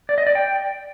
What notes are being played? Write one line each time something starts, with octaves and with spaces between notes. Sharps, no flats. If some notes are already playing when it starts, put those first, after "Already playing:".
D5
D#5
D5
G5